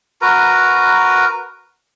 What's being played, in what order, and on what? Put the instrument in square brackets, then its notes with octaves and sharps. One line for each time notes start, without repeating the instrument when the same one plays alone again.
[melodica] F#4 A#4 B4 A#5